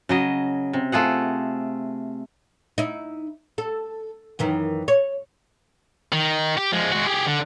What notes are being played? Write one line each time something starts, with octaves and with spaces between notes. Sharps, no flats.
C#3 F#3 D#5
C3
A3 F4 G#4 F#5
D#4 E4
A4
F#2 D#3 E3
C#5
D#3
G4
F3 G#3
G#3 F#4
G4 G#4
D3